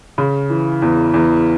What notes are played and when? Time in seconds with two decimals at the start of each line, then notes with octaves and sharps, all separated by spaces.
0.18 C#3
0.50 E3
0.82 E2
1.14 E2